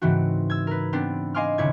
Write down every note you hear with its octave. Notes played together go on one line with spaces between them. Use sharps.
G#2 C#3 E3 C4 F#4
E6 G#6
A#4 B4
B3 C4 D4
D#5 F5 G#5 C6 D6 F6
D#1 C#3 E4 C#5 D6 G#6